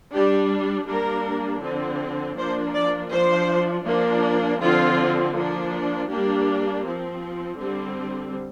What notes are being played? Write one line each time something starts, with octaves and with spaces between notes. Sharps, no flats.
G3 D4 G4
G3 A#3 D4 A#4
D3 F3 C4
F3 A#3 D4 C5
D5
F3 D4 C5
F3 A#3 D4
D3 F3 C4 F4
F3 A#3 D4
G3 A#3 D4 G4
F3 C4
D3 G3 C4